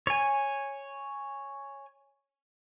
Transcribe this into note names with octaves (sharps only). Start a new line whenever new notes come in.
C#5 G#5